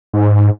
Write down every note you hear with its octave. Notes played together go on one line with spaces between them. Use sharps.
G#2